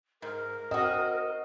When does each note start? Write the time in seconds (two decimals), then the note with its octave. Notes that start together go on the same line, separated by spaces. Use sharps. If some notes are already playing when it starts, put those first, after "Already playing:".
0.22 G#2 A#4
0.71 C4 F#4 D#5